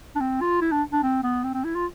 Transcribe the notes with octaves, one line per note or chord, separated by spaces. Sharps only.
D4
C4
F4
E4
D4
D4
C4
B3
C4
C4
E4
F4